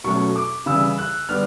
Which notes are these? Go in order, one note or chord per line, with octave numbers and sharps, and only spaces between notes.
B2 F#3 A3 C#4 C#6
D6
C#3 E3 G3 E6
F#6
D3 G3 B3 F6